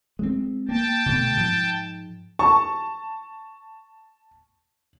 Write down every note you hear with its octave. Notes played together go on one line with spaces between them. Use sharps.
G#3 C4
A#3 G5 A5
B2 D3 A3
G#2 F3 G#3
A5 C#6